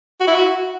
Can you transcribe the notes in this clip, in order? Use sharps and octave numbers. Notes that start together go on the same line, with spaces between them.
F#4
E4
F#4